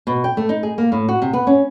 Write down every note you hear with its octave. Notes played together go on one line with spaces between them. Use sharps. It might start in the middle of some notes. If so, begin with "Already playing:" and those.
B2
G5
A3
D#4
G#4
A#3
A2
F#4
C3
B3
C#4